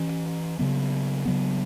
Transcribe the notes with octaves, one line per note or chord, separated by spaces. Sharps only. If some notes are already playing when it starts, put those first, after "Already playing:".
Already playing: E3 C#4
C#3 F#3 B3
C#3 F#3 B3